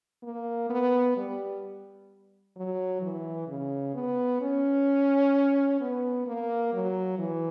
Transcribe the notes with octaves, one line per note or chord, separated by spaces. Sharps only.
A#3
B3
G3
F#3
E3
C#3
B3
C#4
B3
A#3
F#3
E3